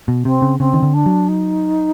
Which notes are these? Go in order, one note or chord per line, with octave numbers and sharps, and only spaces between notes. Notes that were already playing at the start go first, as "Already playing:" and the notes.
B2
C3 C4
C#3
C#3 C4
D#3
D3
D4
F#3
D#4